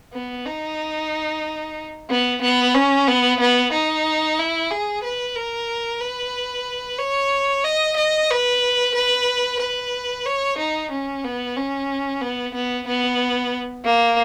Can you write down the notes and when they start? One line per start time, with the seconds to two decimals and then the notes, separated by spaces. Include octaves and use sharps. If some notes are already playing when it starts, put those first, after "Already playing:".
0.13 B3
0.46 D#4
2.10 B3
2.42 B3
2.74 C#4
3.08 B3
3.40 B3
3.73 D#4
4.38 E4
4.70 G#4
5.03 B4
5.35 A#4
6.01 B4
6.99 C#5
7.64 D#5
7.96 D#5
8.30 B4
8.95 B4
9.60 B4
10.26 C#5
10.58 D#4
10.91 C#4
11.24 B3
11.56 C#4
12.21 B3
12.54 B3
12.87 B3
13.85 A#3